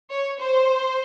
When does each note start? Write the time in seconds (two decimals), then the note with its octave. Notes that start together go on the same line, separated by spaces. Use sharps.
0.11 C#5
0.40 C5